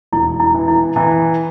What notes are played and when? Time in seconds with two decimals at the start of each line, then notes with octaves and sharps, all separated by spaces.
0.12 E1 E4
0.40 E4
0.54 E3
0.68 E4
0.96 E3 E4